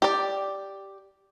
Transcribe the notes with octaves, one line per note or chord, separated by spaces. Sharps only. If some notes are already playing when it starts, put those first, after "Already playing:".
G4 D5